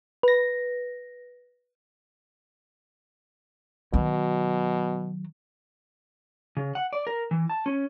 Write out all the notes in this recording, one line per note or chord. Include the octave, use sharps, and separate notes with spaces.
B4 A#6
B2 D#3 F#3
C#3
F#5
D5
A#4
E3
A5
C#4